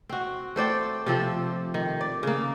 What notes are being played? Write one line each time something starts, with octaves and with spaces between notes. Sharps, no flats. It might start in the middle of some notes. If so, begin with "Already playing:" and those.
C4 F#4
A3 C5 D5 G5
C3 F3 C4 A4
D#3
D5
C#3 A#3